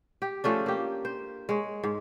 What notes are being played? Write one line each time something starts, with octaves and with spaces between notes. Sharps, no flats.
G4
F3 A3 C#4 D4
A#3 G4
C5
G#3 C#5
G#2